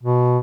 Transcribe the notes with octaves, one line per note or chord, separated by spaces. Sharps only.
B2